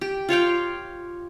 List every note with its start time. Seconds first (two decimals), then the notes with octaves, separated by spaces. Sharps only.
0.01 G4
0.29 F4 C#5 F5 G5